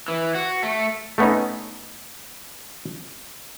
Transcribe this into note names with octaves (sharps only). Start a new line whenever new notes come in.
E3
F#4
A3
A3 B3 C#4 D#4